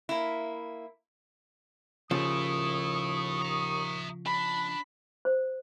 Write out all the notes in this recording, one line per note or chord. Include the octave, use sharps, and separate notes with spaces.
A#3 E4
D#2 C#3 F3 E4 A4 C#6 D#6
E5 A#5
D4 B5
C5